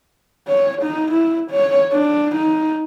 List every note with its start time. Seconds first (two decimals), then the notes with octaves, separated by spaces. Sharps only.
0.48 C#5
0.82 D#4
1.12 E4
1.52 C#5
1.93 D4
2.36 D#4